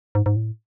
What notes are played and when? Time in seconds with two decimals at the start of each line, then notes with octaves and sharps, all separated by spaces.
0.15 G#2
0.26 G#2
0.36 A2